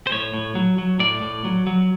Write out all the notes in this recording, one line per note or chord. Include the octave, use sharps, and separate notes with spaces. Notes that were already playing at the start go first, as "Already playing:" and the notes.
C5
A2 C#5
A2
F#3
F#3
A2 D5
A2
F#3
F#3